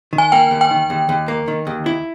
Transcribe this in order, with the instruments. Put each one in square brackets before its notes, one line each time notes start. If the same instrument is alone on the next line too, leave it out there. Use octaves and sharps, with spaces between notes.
[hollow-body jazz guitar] D#3
[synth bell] G#5
[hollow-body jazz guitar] A#3 [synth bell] G5
[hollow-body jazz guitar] D#2
[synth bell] G5
[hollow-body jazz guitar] D#3
D#2
D#2
A#3
D#3
D#2
E4